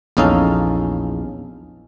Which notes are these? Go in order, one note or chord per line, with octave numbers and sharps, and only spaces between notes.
A#1 E2 C#4 D#4 A4 F5